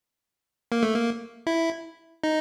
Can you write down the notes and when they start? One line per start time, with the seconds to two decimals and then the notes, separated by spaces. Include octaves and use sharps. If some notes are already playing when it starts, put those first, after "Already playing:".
0.72 A#3
0.83 A3
0.94 A#3
1.47 E4
2.24 D#4